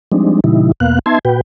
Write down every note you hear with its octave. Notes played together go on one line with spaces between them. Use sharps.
F3 G3 G#3 C4 D4 D#4
A#2 C#3 E3 G3 D#4 E4
E2 B2 A#3 B3 F5 F#6
B3 D#4 E5 A5 C6 G#6
A#2 F#4 B4 G5